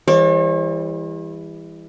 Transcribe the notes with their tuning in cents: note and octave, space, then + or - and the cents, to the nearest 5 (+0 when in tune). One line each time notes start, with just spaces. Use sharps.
E3 +0 G3 +40 C#5 -45